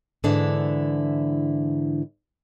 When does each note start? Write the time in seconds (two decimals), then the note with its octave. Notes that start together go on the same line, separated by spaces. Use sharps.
0.24 G#2 D3 E3 D4 E4